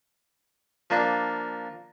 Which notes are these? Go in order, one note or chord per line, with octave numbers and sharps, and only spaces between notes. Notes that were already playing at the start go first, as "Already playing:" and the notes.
F3 A#3 D4